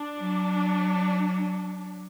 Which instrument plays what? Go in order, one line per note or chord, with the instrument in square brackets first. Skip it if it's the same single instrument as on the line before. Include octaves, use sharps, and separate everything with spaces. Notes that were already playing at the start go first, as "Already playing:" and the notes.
Already playing: [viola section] D4
[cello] F#3